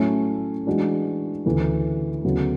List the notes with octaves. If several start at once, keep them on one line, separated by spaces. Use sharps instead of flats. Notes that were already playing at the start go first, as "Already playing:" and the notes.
Already playing: A2 F#3 A3 C#4 E4
E3 G#3 D4 F#4
D2 C#3 E3
D2 C#3 F#3 B3 E4